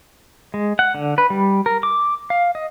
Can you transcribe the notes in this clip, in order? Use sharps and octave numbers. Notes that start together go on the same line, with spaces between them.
G#3
F#5
D3
B4
G3
A#4
D6
F5
D#5